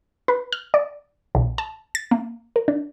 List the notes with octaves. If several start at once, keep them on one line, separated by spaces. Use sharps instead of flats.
B4
F6
D5
B1
A5
A6
A#3
A#4
D4